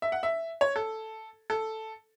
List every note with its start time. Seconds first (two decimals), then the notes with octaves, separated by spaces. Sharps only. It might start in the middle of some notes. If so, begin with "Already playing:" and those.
0.02 E5
0.12 F#5
0.23 E5
0.61 C#5
0.76 A4
1.50 A4